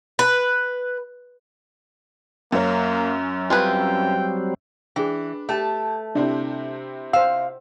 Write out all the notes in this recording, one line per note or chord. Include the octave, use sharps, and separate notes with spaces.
B4
F#2 A#3 C#4
F#3 G3 C4 F4 G#4 B4 G5
E3 D4 G#4 G5
A3 G4 A5
C3 C4 D4 E4
C5 F5 E6